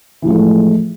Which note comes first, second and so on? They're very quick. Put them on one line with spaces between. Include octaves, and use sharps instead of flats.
E3 A2 F3 G#3 A3